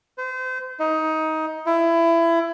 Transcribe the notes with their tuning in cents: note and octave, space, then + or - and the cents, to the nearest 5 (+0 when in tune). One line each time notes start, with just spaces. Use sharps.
C5 -35
D#4 +20
E4 +25